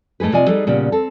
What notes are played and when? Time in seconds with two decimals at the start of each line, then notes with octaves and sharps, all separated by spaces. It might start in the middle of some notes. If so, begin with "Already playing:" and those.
0.20 G#2 A3 D#4 G#4 B4
0.32 C3 F4 D5 D#5 G#5
0.47 G3 D#4 G#4 A4 B4
0.67 A#2 C#3 G3 B3
0.92 C4 A4